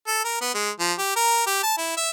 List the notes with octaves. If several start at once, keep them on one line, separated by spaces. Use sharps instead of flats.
A4
A#4
B3
G#3
F3
G4
A#4
G4
A5
E4
E5